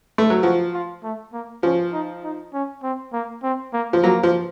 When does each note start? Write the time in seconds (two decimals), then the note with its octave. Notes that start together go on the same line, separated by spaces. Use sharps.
0.18 A3
0.30 F#3
0.43 F3 F#4
0.74 F4
1.04 A3
1.33 A#3
1.63 F3 C#4
1.93 D#4
2.23 D#4
2.54 C#4
2.83 C4
3.13 A#3
3.43 C4
3.73 A#3
3.93 F3
4.03 F#3 A#3
4.23 F3